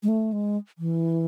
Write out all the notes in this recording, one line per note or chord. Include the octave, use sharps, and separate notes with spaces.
G#3
A3
G#3
E3